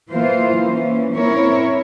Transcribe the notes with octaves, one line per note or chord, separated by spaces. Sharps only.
E3 A#3 F4 C5
E3 A#3 C#4
C4 E4 A#4 C#5